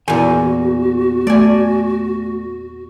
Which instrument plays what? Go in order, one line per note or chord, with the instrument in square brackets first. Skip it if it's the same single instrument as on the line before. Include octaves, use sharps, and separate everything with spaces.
[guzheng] E2 A#2 [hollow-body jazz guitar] E4 G#5 [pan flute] F#4
[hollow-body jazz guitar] A3 [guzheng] D5 G#5